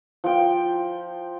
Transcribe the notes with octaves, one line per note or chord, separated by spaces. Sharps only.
F3 G5